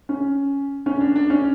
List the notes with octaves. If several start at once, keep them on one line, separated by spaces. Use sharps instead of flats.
C#4
C#4
D4
D4
C#4